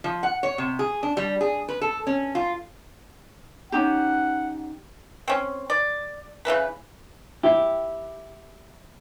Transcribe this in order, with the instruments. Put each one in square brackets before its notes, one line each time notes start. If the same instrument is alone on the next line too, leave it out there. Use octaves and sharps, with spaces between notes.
[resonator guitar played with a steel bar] F3
F#5
C#5
C3
G#4
D4
G3
G#4
B4
A4
C#4
F4
[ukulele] C#4 D#4 G4 [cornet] F#5
[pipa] C4 C#4
D5
C#3 E3 E4 B4
[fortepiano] E4 [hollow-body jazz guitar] G4